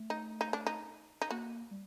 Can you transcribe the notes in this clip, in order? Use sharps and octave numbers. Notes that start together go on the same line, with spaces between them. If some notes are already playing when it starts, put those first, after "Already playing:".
Already playing: A3
D#4
D#4
D4
D#4
D#4
A#3 F#4
G3